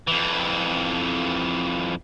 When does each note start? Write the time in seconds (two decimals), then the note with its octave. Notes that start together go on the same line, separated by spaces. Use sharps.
0.07 F2 E3